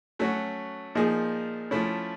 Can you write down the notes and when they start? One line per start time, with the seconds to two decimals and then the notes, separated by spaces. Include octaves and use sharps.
0.19 F#3 A3 C#4 F#4
0.95 A#2 F3 A#3 D#4 G#4
1.71 F3 A3 C#4 E4